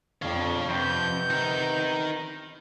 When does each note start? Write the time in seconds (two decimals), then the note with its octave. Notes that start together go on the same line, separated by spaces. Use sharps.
0.22 F2 D4 C#5 F5
0.69 F2 C3 B3 G6
1.30 D#4 A#4